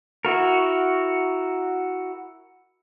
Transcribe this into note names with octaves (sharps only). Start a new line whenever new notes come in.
E4 F#4 A#4